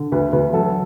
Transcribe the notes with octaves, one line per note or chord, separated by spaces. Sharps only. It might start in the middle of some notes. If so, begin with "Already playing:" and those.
Already playing: D3
D2 B4
D2 B4
F#3 A4